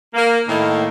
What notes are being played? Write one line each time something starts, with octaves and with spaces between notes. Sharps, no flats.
A#3
A2 D#3 A#3